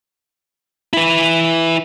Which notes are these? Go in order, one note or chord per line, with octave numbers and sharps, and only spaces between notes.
E4 B4